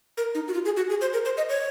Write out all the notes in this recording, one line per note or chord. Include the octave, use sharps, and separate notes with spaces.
A#4
D#4
F#4
F4
G#4
F#4
G#4
C5
A#4
C5
D#5
C#5